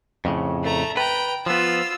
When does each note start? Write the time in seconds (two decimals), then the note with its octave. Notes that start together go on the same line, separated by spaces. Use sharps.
0.25 F2 A2 C#3
0.63 A3 A#5
0.97 B4 G5 A#5
1.46 F3 B3 F4 E6